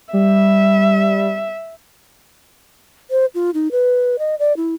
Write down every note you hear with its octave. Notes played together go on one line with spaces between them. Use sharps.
G3 E5
C5
F4
D#4
B4
D#5
D5
E4